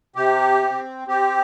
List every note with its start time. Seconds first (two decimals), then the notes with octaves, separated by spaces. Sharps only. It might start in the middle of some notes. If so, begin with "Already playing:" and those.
0.16 C3 G4
0.62 C4
1.08 C4 G4